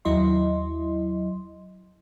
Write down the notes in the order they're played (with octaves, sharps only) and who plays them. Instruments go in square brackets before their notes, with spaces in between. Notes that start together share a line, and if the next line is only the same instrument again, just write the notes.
[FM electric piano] D#2 F#3 E4 D#5 C6